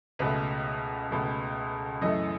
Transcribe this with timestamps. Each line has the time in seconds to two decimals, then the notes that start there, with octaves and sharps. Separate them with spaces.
0.19 C#2 B2 A3 B4
1.11 C#2 B2 A3
2.01 F#2 E3 A3 D#5